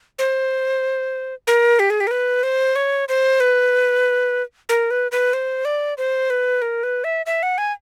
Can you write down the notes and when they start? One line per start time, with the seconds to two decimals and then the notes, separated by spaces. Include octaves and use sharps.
0.19 C5
1.47 A#4
1.79 G4
1.90 G#4
2.00 G4
2.07 A#4
2.11 B4
2.43 C5
2.76 C#5
3.09 C5
3.40 B4
4.69 A#4
4.91 B4
5.12 B4
5.33 C5
5.65 D5
5.98 C5
6.30 B4
6.62 A#4
6.83 B4
7.04 E5
7.26 E5
7.43 F#5
7.58 G#5